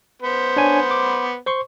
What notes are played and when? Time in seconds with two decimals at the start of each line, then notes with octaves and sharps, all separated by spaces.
0.22 B3 C5
0.57 D4 C#5 G#5
0.91 D6
1.46 C5 C6 C#6